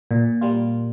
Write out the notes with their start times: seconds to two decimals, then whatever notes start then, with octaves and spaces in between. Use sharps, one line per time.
0.11 A#2
0.41 G3 A#3 F4